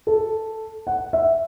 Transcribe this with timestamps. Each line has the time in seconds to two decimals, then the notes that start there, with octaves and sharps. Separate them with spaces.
0.07 A4
0.87 F#5
1.13 E5